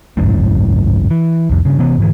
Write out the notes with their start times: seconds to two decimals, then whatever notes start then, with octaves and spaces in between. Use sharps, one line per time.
0.17 G#1 C#2 F#2 A2
1.11 E3
1.50 C2 F2
1.65 G2 C#3
1.79 C3 E3 B3
1.98 G#2 D3 E3